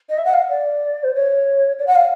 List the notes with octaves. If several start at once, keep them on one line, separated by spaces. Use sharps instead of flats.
D#5
E5
F#5
F5
D5
C5
C#5
D5
F#5
F5